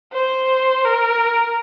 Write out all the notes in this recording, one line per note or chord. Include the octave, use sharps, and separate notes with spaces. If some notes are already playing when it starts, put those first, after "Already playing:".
C5
A#4